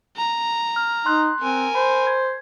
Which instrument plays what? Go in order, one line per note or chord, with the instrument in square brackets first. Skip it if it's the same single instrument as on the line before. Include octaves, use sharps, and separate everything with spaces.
[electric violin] A#5
[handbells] F6
[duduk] D#4 [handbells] C6 F#6
[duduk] C4 [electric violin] A#4 G#5
[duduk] C5 [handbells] B5
[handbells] G#6